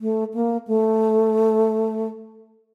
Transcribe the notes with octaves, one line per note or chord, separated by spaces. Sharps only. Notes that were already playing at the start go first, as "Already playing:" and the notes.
A3
A#3
A3